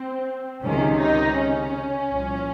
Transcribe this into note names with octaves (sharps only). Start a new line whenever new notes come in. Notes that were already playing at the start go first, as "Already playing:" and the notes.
Already playing: C4
C#2 C3 D#3 C#4
D#4
C#4
C2 A#2 F3